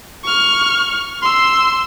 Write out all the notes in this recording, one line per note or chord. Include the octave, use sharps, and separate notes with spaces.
C#6 F6
C6 E6